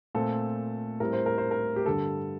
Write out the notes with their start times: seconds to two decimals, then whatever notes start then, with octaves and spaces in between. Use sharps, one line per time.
0.15 A#2 A3 C4 A4
1.00 A2 G3 C4 A#4
1.13 C5
1.26 A#4
1.38 C5
1.51 A#4
1.76 G4
1.86 G2 D3 G3 A4